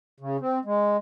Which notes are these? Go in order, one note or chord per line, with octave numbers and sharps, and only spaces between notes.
C#3
C4
G#3